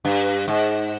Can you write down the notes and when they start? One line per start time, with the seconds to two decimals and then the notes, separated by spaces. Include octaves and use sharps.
0.05 G2
0.48 G#2